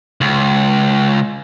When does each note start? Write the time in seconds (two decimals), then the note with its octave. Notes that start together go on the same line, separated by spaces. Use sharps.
0.21 C#2